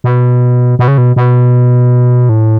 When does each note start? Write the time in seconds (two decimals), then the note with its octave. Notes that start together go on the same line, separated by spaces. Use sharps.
0.04 B2
0.79 B2
0.88 C#3
0.98 B2
1.16 B2
2.29 A2